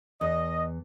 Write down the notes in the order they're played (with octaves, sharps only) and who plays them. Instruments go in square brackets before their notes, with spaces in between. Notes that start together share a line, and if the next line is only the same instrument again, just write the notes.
[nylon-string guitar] E2 [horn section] D#5